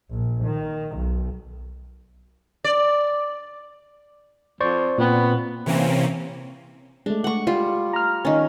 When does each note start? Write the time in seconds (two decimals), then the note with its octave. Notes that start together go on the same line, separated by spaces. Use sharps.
0.12 A#1
0.43 D#3
0.98 B1
2.64 D5
4.61 F2 C5 D5 C#6
4.98 A#2 B3 C4
5.66 C3 E3 A#3 C4 C#4
7.06 G#3 A3 D4
7.24 F#5 C#6
7.47 G3 F4
7.93 A#5 F6
8.25 D#3 C#4